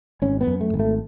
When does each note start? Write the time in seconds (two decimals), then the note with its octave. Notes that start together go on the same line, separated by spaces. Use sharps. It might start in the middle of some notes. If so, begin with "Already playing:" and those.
0.22 G#1 C#4
0.41 B3
0.47 F#2
0.61 A3
0.74 G#1
0.80 A3